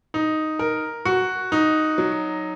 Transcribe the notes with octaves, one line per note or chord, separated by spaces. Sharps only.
D#4
A#4
F#4
D#4
F#3